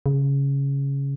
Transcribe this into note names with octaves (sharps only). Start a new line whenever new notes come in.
C#3